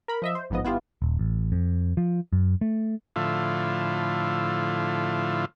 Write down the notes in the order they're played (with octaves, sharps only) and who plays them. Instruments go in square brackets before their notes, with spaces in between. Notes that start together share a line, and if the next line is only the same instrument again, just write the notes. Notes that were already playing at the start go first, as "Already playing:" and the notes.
[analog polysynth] A#4 B5
F3 D#5 E5
C5
A1 G#2 F3 B3 D#5
G1 B3 E4 F4 G4
[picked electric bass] D#1
A1
F2
F3
F#2
A3
[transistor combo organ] A2 D3 F3 E4 F4